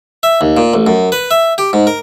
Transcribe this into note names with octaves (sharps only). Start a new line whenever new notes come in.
E5
D#2
A#2
A1
F#2
B4
E5
G4
G#2
A#4